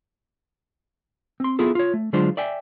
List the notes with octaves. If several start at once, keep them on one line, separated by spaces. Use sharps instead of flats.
C4 C6
B3 E4 F4 G#4 A4
F4 C#5
A3
D3 F#3 G#3 D4 F4 C5
D5 E5 G5 G#5